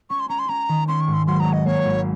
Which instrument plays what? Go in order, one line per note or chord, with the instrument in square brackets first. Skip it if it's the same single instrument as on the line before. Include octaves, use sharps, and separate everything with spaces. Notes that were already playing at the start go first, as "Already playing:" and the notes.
[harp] C#4 [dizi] C#6
[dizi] C6
[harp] C#4 [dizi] A#5
[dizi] C6
[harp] C#4 [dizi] A#5
[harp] D#3
[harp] C#4 [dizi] C6
[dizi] C#6
[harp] G#2
[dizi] C6
[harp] F#3 [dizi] C6
[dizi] A#5
[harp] C#4
[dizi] D#5
[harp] A#3 [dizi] C#5
[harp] G#1